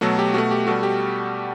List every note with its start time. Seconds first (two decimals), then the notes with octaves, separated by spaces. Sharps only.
0.01 B2 F#3 A3 F#4 A4
0.19 G4
0.34 B2 A3 F#4
0.51 G4
0.67 B2 G3 F#4 A4
0.83 G4